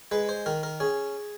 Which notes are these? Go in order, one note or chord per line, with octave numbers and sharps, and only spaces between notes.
G#3 B4
C5
D#3 A#4
A#4
C#4 G#4